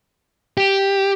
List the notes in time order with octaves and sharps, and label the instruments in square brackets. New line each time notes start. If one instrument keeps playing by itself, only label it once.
[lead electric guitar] G4